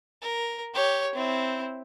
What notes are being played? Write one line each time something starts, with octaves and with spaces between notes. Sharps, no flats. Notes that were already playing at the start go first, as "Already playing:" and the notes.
A#4
G4 C#5
C4 E4